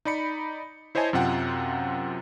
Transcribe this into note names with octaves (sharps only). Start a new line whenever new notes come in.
D#4 D5 B5 C#7
E4 C5 C#5 D#5 G#5 A5
F#2 C3 F4 F#5 G5